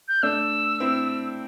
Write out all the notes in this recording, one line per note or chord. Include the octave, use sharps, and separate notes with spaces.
G6
A3 D4 E6
C4 E4